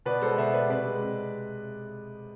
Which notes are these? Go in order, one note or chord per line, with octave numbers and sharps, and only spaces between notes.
B2 B4 D5
G#3 A4 C5
B2 C5 E5
G#3 B4 D5
C3 B4 D5
G#3
C3